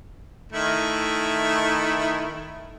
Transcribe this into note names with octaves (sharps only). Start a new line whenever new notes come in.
D#3 A3 E4